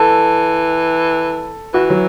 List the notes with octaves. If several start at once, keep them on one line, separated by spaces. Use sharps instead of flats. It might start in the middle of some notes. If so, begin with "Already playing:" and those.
Already playing: E3 A4
E3 F#4
F#3